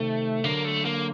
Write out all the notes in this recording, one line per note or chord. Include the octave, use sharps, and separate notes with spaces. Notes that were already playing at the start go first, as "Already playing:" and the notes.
Already playing: C3 D#3 A3
D3 F#3 A#3
A3
A#3